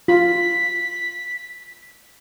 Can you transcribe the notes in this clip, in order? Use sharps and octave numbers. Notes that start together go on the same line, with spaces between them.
F4 B6